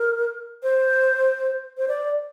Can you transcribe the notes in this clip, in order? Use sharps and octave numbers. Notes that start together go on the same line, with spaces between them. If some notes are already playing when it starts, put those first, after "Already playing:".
Already playing: A#4
C5
C5
D5